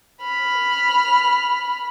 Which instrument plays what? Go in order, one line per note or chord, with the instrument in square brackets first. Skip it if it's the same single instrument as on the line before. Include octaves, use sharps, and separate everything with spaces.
[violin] B5 F6